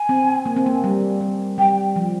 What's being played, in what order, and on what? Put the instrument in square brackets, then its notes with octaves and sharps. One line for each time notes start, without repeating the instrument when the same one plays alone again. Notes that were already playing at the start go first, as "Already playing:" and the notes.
Already playing: [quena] G#5
[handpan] C4
A#3
C4
A#3
G3
G3
[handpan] G3 [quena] G5
[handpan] F3